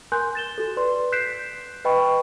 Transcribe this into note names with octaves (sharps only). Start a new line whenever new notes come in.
A#4 G#5 C6 F#6 G6
A6 E7 G7
F#4 A4
B4 D5 C6
F#6 G6 B6 C7 D7 E7
B4 D#5 G5 B5 C#6